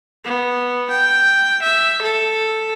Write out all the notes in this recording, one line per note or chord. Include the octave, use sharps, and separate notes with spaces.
B3
G5
E5
A4